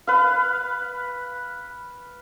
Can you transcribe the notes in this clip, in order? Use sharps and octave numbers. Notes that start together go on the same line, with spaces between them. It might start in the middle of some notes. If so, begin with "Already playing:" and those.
B4 F5